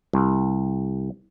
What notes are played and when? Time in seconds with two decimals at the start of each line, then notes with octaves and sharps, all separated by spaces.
0.13 C2